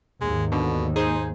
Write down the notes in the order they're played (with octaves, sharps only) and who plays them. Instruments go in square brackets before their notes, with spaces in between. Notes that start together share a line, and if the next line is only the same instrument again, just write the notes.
[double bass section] D#2 G#2 [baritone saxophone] G#3
[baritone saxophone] B2 [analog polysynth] D3
[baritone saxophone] D#4 [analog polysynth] G#4 C5